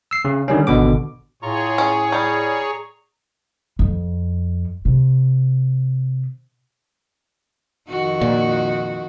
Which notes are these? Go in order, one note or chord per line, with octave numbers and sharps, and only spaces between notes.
E6 C7
C#3
D3 D#3 G3 C#4
G#1 B2 D3 D6
A2 F4 G#4 C#5 A#5 C#6
C#4
G3 A#5 C#6
F2
C3
F2 D#3 F#4
A#2